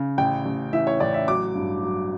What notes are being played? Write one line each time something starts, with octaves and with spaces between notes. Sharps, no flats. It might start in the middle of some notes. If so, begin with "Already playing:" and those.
Already playing: C#3
A1 G5
A1
E3 E5
C#5
A1 D5
E5
F#3 D6
G2
F#3